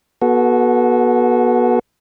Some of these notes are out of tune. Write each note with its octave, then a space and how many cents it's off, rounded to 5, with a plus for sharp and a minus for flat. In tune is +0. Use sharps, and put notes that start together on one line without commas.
B3 -30 F#4 +0 A4 -30